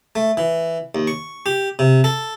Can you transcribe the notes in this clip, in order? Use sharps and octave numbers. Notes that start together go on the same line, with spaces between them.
A3
E3
D#2
C#6
G4
C3
A4